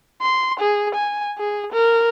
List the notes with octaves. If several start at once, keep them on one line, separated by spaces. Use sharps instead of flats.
C6
G#4
G#5
G#4
A#4